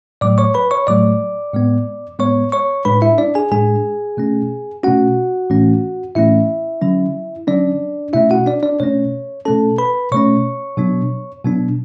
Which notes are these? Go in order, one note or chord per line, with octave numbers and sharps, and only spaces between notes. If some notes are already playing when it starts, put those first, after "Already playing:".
A2 F#3 A3 D5 D6
C#5 C#6
B4 B5
C#5 C#6
A2 F#3 A3 D5 D6
A2 G#3 B3
A2 G#3 B3 C#5 C#6
C#5 C#6
A2 G#3 D4 B4 B5
E4 E5
D4 D5
G#4 G#5
A2 G#3 D4 G#4 G#5
B2 A3 C#4
B2 A3 C#4 F#4 F#5
A2 E3 A3 C#4
A2 E3 A3 C#4 E4 E5
D3 F#3 C#4
D3 F#3 C#4 D4 D5
B2 A3 C#4 E4 E5
F#4 F#5
D4 D5
D4 D5
B2 A3 C#4 C#5
B2 A3 C#4 A4 A5
B4 B5
B2 A3 C#4 C#5 C#6
B2 F#3 B3 D4
B2 F#3 B3 D4